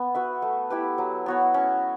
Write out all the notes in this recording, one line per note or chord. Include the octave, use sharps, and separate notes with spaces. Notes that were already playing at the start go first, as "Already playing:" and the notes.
Already playing: B3
F#4 B4 E5
A3
E4 G4 B4
F#3
B3 F#4 C#5
C#4